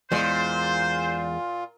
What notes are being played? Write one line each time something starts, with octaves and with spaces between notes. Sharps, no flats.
E2 A#2 G#3 F4 C5